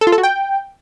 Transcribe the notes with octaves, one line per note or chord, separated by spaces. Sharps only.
A4
F4
A4
F#4
G5